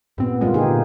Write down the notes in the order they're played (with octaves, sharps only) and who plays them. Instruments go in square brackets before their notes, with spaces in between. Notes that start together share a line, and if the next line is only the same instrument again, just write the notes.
[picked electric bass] G2 C4 [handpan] A#2 B3
[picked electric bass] G2 G3 G#3 [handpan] A#3 C4 F4
[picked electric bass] A#2 D3 [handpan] D#4 G4 G#4